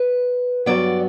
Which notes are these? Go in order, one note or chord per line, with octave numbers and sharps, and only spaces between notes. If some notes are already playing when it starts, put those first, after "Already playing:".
Already playing: B4
G2 F#3 B3 D5